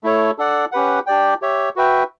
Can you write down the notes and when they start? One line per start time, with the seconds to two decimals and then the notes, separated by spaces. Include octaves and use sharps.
0.03 A3 E4 A4 C#5
0.38 D4 A4 D5 F#5
0.72 C#4 G4 B4 F#5
1.06 D4 G4 D5 G5
1.42 G4 C#5 E5
1.76 F#4 B4 E5 G5